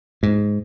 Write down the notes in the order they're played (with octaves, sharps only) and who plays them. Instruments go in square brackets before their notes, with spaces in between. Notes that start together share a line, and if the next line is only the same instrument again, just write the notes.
[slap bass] G#2